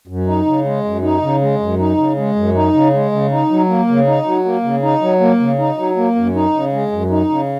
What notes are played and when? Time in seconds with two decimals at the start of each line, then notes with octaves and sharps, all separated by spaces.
0.08 F#2
0.27 D#4
0.46 C#3
0.64 G#3
0.84 F#2
1.03 D#4
1.22 C#3
1.41 G#3
1.60 F#2
1.79 D#4
1.97 C#3
2.17 G#3
2.36 F#2
2.54 D#4
2.74 C#3
2.93 G#3
3.12 C#3
3.31 D#4
3.50 F#3
3.69 A#3
3.88 C#3
4.07 D#4
4.26 F#3
4.45 A#3
4.63 C#3
4.83 D#4
5.01 F#3
5.20 A#3
5.40 C#3
5.59 D#4
5.77 F#3
5.97 A#3
6.16 F#2
6.35 D#4
6.54 C#3
6.73 G#3
6.92 F#2
7.10 D#4
7.29 C#3